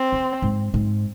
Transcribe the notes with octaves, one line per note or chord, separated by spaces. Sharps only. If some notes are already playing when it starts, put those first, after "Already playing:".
Already playing: C4
C#3
G#2
G#2